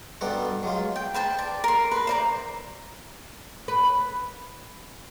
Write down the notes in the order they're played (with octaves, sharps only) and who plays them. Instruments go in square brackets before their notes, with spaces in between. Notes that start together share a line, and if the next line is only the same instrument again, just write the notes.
[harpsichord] G2 B2 G3 A4 F#5 A#5
F#3 G#3 F4
[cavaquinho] G5
B4 C5 G5 A5
D5
A#4 C6
B4
C5 D5 A#5
[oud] B4